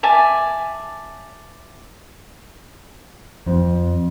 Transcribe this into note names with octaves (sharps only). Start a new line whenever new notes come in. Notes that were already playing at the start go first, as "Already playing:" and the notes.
D5 E5 G#5 A5
F2